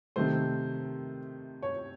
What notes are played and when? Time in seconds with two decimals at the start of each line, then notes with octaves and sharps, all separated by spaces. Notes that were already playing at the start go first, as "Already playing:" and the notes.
0.16 C3 D#3 A3 C5
1.63 C#5